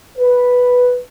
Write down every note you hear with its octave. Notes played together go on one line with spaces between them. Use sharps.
B4